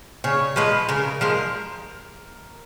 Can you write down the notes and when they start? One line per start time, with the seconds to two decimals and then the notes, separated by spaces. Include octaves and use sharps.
0.24 C#3 C#5
0.56 F3 G#3 B4
0.89 C#3 A#4
1.21 F3 G#3 A#4